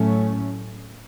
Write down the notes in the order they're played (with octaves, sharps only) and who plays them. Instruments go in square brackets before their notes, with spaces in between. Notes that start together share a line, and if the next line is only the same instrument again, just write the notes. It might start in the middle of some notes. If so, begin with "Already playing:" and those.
Already playing: [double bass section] A2 F#3 A3 C#4